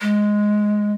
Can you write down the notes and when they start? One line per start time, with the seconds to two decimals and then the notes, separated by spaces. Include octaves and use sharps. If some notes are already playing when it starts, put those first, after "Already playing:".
0.01 G#3